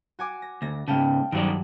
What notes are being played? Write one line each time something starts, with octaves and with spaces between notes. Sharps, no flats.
F#4 G#5 D6
A#6
D2 A#6
G#2 C#3 F5 G5 A5
G2 D#3 F#3 F#4 D5